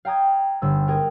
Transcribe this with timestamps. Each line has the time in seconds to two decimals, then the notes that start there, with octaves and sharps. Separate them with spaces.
0.05 F5 G5 A#5 D#6 G#6
0.62 G1 E6
0.87 G#4 A#4 G5